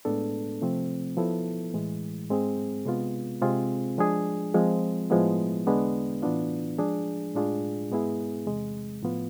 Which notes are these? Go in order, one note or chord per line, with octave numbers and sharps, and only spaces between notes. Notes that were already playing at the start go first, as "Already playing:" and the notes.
A2 G#3 B3 D4 A4
C3 F3 A3 C4
F3 B3 E4 A4
A2 E3 G#3
G#2 G#3 C4 G#4
C3 G#3 B3 F4
C3 G#3 C4 F4 G#4
F3 G#3 D4 G#4
F3 G#3 C4 F4
A2 F3 G#3 B3 E4
E2 D3 G#3 B3 D4
A2 E3 B3 D4 F4
F3 G#3 D4 G#4
A2 G#3 D4 F4 G#4
G#2 G#3 B3 E4 G#4
E2 C3 G#3
A2 F3 B3 F4